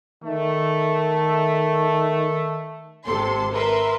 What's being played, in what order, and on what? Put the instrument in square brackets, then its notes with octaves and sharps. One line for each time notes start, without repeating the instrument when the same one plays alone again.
[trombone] D#3 [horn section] A3
[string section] G#1 C3 A4 C6
A#4 B4 E5 C6